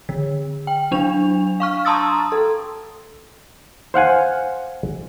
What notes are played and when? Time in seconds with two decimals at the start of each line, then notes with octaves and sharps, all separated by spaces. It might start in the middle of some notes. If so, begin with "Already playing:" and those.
0.09 D3
0.67 G5
0.91 F#3 D4 F7
1.60 F5 C#6 F6
1.85 A5 A#5 C6 D#6 E6 A6
2.32 A4
3.94 C5 F5 F#5 G#5